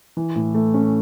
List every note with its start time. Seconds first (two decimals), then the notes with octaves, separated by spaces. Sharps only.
0.17 E3
0.35 A2
0.55 A3
0.74 C#4